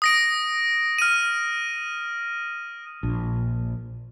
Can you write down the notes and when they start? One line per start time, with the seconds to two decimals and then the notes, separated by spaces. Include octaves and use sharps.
0.02 D#6 A#6 D7
0.98 F6 D#7
3.03 A#1